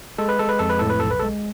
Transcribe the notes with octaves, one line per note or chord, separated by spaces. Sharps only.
G#3 A4
B4
G#3 A4
B4
F2 A4
B4
A2 A4
B4
B1 A4
B4
A4
G#3